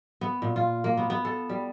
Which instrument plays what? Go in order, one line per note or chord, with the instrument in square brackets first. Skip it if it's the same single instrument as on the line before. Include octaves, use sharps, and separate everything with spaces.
[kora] B3
A#2
F4
A#3
B3
B3
A4
G3